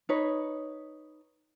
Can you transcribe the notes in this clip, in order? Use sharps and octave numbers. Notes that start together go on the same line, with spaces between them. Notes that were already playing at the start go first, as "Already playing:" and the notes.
D#4 B4 C#5